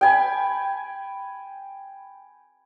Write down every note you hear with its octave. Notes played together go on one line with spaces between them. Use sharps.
G5 G#5 B5